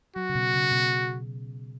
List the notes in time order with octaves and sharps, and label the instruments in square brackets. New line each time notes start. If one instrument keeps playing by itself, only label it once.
[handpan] F#3 [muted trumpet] F#4
[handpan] C#3
B2
C#3
B2